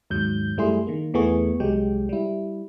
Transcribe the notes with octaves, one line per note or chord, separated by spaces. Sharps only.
D#2 G#2 F#3 G6
F#2 G3 A3 E4 G#4 C6
D#3 A#3
E2 E3 A3 B3 G#4 C#6
C2 F#3 G#3 G4 G5
G3 E4